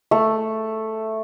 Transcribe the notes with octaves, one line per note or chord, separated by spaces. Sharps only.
A3